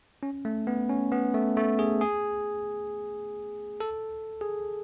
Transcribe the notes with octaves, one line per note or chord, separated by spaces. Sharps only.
C#4
A3
B3
C#4
B3
A3
A3
G#4
G#4
A4
G#4